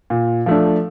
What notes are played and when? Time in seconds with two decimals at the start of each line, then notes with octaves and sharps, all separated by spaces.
0.10 A#2
0.46 F3 A3 D4